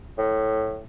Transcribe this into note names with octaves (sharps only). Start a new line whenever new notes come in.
A2